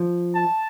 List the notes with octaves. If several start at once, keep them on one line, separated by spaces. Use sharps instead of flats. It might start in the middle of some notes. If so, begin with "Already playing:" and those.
Already playing: F3
A5